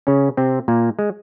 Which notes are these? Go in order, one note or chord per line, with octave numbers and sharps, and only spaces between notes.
C#3 C#4
C3 C4
A#2 A#3
G#3